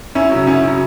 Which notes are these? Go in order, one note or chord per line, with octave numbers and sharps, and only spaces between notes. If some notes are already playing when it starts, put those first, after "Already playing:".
F#2 C#4 E4
C#3 F#3
F#2 C#4 E4
C#3 F#3